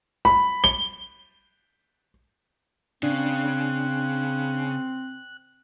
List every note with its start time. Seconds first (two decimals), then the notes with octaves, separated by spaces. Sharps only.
0.25 B5
0.64 G7
3.03 C#3 C4 D4 F#6